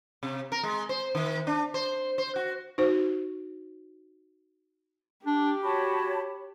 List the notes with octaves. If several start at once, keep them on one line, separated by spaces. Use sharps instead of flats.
C3
A#4
G#3
C5
D#3
D4
C5
C5
F#4
D#4 F#4 C5
D4 G4
F#4 C#5 A5 B5